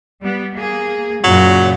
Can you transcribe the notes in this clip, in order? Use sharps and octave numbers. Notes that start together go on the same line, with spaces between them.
G3 B3
A#3 G#4
F#2 A#2 C#3 F#3